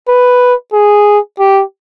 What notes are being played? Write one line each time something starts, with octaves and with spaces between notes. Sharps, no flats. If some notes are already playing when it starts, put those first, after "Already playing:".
B4
G#4
G4